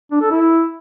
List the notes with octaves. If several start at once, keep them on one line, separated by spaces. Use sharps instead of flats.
D4
A4
E4